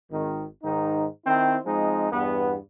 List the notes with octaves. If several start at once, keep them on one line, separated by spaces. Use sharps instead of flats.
G#1 D#3
G#2 D#3 D#4
D#3 C4 E4
F3 G#3 C4 D#4
E2 G2 B3